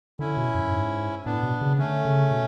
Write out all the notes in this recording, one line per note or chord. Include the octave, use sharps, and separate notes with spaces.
D3 C#4 E4
B2
F#2
G#2
A2 B3 D4
B2
C#3
D3 A3 C#4
C#3
B2